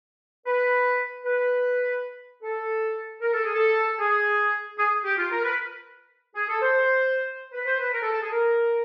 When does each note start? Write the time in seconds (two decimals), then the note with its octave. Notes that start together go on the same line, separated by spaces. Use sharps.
0.47 B4
1.25 B4
2.43 A4
3.22 A#4
3.33 A4
3.44 G#4
3.55 A4
4.00 G#4
4.79 G#4
5.05 G4
5.18 F4
5.31 A#4
5.44 B4
6.36 G#4
6.49 A4
6.62 C5
7.54 B4
7.67 C5
7.80 B4
7.93 A#4
8.02 A4
8.12 A4
8.22 G#4
8.32 A#4